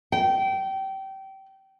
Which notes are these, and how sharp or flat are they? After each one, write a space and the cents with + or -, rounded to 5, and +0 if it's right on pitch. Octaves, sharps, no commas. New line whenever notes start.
G5 -25